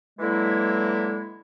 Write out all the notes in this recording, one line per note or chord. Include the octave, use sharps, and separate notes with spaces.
D3 E3 F#3 G#3 A#3 E4